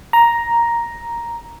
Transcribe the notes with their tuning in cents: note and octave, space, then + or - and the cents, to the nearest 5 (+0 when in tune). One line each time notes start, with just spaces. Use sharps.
A#5 +5